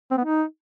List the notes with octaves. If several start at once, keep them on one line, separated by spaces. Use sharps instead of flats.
C4
B3
D#4